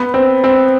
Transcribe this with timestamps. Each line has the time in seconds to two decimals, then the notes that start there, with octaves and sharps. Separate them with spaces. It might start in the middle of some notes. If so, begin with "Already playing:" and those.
Already playing: B3
0.14 C4
0.44 C4